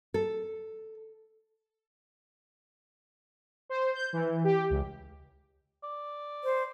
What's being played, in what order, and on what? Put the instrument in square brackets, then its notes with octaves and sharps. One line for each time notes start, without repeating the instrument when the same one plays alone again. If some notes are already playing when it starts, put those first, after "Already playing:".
[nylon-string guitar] A4
[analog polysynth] C5
G6
E3
G4
C#2
[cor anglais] D5
[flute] C5